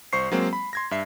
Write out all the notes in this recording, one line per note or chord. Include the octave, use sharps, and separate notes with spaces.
C2 C5 C#6 C7
F#3 G#3 A#3 C4
B5
C6 G#6 A#6
G2 E5 C7